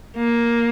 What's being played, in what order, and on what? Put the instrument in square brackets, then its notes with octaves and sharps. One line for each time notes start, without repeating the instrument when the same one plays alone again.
[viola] A#3